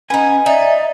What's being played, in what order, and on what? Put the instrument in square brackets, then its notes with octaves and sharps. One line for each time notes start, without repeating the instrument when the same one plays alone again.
[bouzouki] B3 D#4 [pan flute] C#4 [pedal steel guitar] G#5
[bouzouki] D#4 [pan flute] D5 [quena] E5